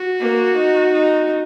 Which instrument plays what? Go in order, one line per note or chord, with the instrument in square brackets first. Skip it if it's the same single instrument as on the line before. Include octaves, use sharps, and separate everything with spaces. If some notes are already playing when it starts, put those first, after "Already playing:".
Already playing: [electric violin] F#4
[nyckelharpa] A#3
D#4
D#4